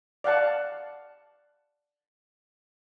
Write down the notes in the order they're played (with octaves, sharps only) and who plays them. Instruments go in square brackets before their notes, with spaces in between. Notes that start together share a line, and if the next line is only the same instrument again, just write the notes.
[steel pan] D5 F5 F#5 A5